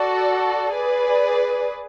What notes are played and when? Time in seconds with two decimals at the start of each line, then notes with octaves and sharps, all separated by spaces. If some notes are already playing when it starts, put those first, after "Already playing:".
Already playing: F#4 A4 D5
0.73 G#4 B4 D5